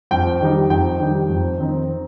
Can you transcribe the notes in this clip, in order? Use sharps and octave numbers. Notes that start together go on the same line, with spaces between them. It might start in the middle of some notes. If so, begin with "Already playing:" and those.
F2 G5
D#3 G3 D#4
F2 G5
D#3 G3 D#4
F2
D#3 C4 D#4